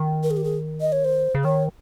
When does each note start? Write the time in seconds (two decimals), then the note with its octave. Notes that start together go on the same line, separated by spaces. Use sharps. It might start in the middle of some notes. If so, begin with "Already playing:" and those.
Already playing: D#3
0.23 A#4
0.31 G#4
0.37 G4
0.44 G#4
0.81 D#5
0.92 C#5
1.05 C5
1.35 C#3
1.44 D#3 C#5